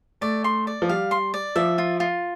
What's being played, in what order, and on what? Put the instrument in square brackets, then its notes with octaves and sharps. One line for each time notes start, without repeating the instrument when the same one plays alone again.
[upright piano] A3 [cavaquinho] D5
[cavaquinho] C6
D5
[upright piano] F3
[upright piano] G3 [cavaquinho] F5
[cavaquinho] C6
D5
[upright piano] F3 [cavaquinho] E5
[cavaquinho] F4
F4